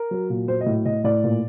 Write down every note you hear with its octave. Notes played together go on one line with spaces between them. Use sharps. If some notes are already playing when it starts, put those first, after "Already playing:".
Already playing: A#4
F#3
A#2
F#3 C5
D#5
A2
A2 D#5
A2 D5
A#2